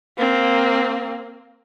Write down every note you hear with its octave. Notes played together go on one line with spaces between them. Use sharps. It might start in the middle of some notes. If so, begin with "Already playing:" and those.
A#3 C4